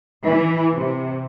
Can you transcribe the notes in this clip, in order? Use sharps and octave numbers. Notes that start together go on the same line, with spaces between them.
E3
C3